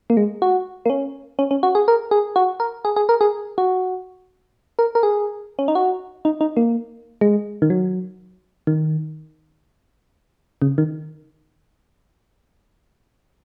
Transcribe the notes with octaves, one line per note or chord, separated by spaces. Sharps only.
A#3
G#3
F#4
A#3
C#4
C#4
C#4
F#4
G#4
A#4
G#4
F#4
A#4
G#4
G#4
A#4
G#4
F#4
A#4
A#4
G#4
C#4
D#4
F#4
D#4
D#4
A#3
G#3
D#3
F#3
D#3
C#3
D#3